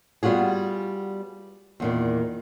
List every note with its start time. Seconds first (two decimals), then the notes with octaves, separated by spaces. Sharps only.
0.23 G3 B3 F4 F#4 G#4
1.80 E2 A#2 D#3